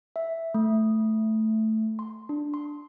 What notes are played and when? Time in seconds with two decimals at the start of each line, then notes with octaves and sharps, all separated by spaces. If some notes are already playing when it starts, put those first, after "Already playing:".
0.16 E5
0.54 A3
1.99 C6
2.29 D4
2.54 C6